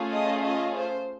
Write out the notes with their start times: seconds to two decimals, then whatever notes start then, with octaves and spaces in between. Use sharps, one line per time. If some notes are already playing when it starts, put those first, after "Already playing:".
Already playing: A3 C#4 F4 G#4
0.12 D#5
0.43 D#5
0.75 C5